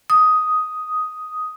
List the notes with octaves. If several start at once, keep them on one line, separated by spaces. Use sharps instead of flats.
D#6